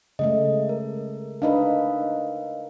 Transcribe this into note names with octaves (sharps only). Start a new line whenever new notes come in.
C#3 G#3 A3 D#5
A#4
D4 D#4 A#4 B4 D#5 F5